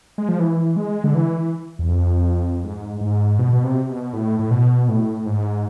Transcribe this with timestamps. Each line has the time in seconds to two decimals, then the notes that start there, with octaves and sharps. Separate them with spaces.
0.18 G#3
0.29 F3
0.39 E3
0.76 G#3
1.04 D3
1.15 E3
1.79 E2
1.88 F2
2.64 G#2
3.01 G#2
3.39 B2
3.53 B2
3.64 C3
3.89 B2
4.13 A2
4.39 A2
4.51 B2
4.89 A2
5.26 G#2